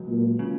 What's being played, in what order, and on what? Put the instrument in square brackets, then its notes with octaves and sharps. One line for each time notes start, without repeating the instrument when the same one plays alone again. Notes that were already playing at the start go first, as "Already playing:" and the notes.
Already playing: [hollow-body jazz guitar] C#2 F#3
[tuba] A#2
[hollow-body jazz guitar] C#3